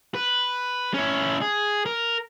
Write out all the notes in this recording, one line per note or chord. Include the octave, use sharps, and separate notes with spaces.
B4
C#4 E4
G#4
A#4